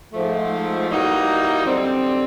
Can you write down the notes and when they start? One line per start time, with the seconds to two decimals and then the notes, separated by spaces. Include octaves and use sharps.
0.13 G#2 F3 A3
0.89 E3 G3 A#3 D#4 F#4
1.66 F#2 D3 G3 C4